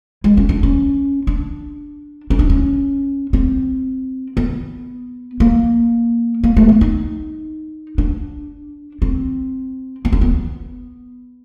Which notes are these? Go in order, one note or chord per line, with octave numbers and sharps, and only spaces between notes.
G#3
C#4
D4
C#4
D4
C#4
D4
C#4
C4
B3
A#3
A#3
A3
B3
D#4
D4
C4
B3
C4
B3